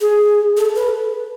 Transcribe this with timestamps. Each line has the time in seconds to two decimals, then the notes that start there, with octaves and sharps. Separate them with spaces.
0.01 G#4
0.57 A4
0.75 B4